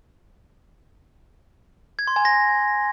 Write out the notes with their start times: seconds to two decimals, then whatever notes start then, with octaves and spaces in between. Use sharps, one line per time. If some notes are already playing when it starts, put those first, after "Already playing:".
1.99 G#6
2.07 C6
2.16 G#5
2.25 A#6